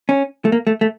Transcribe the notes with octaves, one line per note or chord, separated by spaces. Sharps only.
C#4
A3
A#3
A3
A3